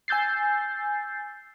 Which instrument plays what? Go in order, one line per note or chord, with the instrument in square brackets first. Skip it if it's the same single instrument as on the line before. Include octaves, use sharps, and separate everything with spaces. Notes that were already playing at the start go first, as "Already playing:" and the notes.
[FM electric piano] G#5 E6 G6 A6 C7